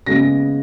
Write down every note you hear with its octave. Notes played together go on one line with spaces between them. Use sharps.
C#3 G#3 B3 A#6